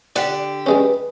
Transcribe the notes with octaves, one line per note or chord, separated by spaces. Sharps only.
D3 G4 D5 F#5
G3 G#3 C#4 B4